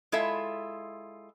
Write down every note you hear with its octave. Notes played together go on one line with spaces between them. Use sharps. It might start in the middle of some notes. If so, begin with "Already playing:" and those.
G#3 E4 F4 A4 E5